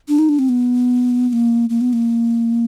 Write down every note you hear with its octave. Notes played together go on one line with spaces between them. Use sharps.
D4
D#4
D4
C4
B3
B3
A#3
A#3
B3
A#3